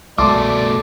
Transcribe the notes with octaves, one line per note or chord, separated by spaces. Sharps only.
C2 B2 G#3 A3 D5 A5 C6 D6